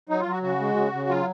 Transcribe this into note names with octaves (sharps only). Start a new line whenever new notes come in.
F#3 D#4
F4
F#3
F#4
C#3 F#4
G#3
C#3
C#3
F#3 F4